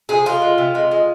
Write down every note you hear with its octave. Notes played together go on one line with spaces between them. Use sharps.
C3 G#4
G#3 F4
G#3
C3
G#3
G#3